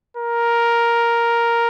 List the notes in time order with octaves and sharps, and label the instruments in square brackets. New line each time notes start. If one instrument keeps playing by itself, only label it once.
[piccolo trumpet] A#4